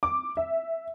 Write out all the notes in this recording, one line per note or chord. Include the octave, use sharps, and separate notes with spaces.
D6
E5